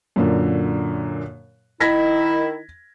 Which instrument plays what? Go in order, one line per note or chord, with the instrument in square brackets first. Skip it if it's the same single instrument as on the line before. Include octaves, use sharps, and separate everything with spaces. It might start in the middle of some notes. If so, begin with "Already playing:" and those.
[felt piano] F#2 A#2 D3
[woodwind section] D#3 E4 [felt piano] G#6 A#6 B6